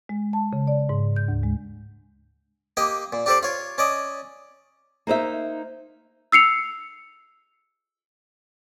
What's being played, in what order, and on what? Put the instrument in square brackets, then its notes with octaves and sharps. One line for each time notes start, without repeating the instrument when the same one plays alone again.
[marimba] G#3
A5
C#3
D5
G#2
G6
D2
G#3
[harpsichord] A#3 G4 D#5
A#2
D4 G4 A4 C5 D5
F4 C#5
C#4 D5 D#5
[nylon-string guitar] A#3 D#4 C5 E5
[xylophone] E6 C7 C#7 F7